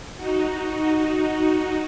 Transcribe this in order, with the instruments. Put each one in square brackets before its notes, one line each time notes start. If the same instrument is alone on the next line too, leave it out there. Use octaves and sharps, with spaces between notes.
[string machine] D#4 F#4